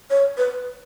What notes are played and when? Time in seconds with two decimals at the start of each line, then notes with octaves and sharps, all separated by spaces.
0.10 C#5
0.38 B4